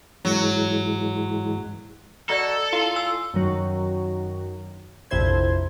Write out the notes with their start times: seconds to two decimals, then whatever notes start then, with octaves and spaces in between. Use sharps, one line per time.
0.25 G#2 E3 F#3 G#3
2.29 F#4 A4 D5 D#5 A#5
2.73 E4 F4
2.96 G#5 E6
3.34 F#2 D#3 F#3
5.11 A#1 F2 C3 E4 C5 G#6